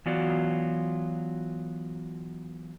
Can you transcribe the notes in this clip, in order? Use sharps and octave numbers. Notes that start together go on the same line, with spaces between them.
E3 F#3 B3 F4 F#4 D5